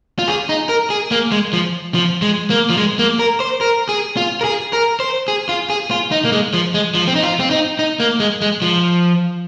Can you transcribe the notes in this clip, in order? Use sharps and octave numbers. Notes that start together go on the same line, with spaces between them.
F4
G#4
D#4
A#4
G#4
A#3
G#3
F3
F3
G#3
A#3
F3
G#3
A#3
A#4
C5
A#4
G#4
F4
A#4
G#4
A#4
C5
G#4
F4
G#4
F4
D#4
A#3
G#3
F3
G#3
F3
C4
D#4
F4
C4
D#4
D#4
A#3
G#3
G#3
F3